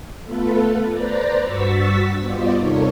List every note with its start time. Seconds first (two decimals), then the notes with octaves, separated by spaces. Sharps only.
0.23 A3 B3 F4 A4 B4
0.88 B4 C5 D5 A#5
1.43 G2 F#4 C#6 E6 A6 B6
2.18 G3 B3 F4 C5 D5 D#5
2.54 D#2 C3 D#4 A4 A#4 C#5